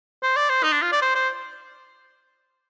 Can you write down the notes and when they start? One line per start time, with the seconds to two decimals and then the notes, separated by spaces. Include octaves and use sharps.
0.23 C5
0.36 D5
0.49 C5
0.63 D#4
0.73 D4
0.82 F4
0.92 D5
1.02 C5
1.15 C5